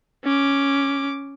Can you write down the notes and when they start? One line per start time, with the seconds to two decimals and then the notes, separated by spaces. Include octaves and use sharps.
0.24 C#4 D6